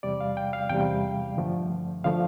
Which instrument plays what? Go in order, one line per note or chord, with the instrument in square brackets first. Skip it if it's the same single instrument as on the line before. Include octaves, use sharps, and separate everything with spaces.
[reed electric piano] E2 C3 G3 D5
F5
G5
F5
E2 C3 G3 G5
G2 D3 F3 A3
D3 F3 A3 F5